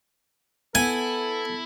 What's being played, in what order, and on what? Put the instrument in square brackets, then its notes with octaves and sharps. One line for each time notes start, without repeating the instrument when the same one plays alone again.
[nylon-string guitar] B3 [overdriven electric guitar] E4 [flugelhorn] A4 [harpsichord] G#5